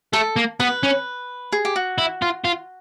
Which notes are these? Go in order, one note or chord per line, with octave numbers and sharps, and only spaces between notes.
A3 A4
A#3
B3 B4
C#4
G#4
G4
F#4
E4
F4
F4